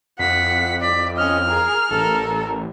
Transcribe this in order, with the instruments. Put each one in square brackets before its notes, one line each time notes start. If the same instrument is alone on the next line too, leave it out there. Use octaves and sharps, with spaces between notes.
[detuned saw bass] F2 [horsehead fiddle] F#5 [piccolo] B6
[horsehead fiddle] D5 [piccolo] B6
[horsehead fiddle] C#4 D#5 [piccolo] F6
[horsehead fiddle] G#4 A#4
[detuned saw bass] A1 [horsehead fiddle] A4 A#4